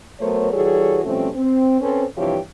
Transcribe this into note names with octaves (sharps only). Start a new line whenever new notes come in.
F#3 A3 B3 A#4 C5 C#5
E3 G3 F#4 G#4 A4 C#5
B2 F3 G3 A3 C4 C#4
C4
C4 C#4 A4 B4 C5
G2 C3 E3 F3 G4 C#5